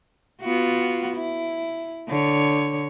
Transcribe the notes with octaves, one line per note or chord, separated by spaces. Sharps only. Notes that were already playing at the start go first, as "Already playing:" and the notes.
B3 F4 F#4
E4
D3 C#5